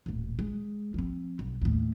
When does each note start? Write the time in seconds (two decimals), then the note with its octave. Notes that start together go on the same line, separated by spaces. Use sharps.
0.06 D#1 A1
0.39 G#3
0.94 F3 C4
1.39 B1
1.62 D#2 A2